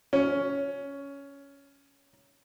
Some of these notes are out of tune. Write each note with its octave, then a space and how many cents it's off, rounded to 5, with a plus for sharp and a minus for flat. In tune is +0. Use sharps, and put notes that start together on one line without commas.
C#4 +10